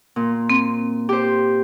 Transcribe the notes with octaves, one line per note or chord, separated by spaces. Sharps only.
A#2
C4
G4 C5